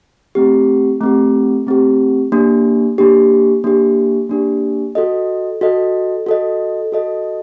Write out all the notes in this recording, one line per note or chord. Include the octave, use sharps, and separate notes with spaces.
A3 C4 G4
A3 C4 G4
A3 C4 G4
A#3 D4 G4
A#3 D4 G4
A#3 D4 G4
A#3 D4 G4
F#4 A4 D#5
F#4 A4 D#5
F#4 A4 D#5
F#4 A4 D#5